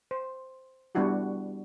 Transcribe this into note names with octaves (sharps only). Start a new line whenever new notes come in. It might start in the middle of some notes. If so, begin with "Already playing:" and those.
C5
G3 B3 D4 E4 F#4 G4